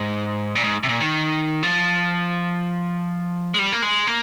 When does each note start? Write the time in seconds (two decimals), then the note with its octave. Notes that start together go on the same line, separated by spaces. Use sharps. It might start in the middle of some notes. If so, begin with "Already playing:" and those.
Already playing: G#2
0.55 A#2
0.64 G#2
0.83 C3
0.89 A#2
1.00 D#3
1.63 F3
3.54 G#3
3.59 G3
3.72 A#3
3.82 G#3
4.07 A#3